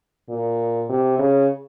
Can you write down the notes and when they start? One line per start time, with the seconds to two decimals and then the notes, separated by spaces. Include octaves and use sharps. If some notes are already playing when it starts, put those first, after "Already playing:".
0.29 A#2
0.90 C3
1.19 C#3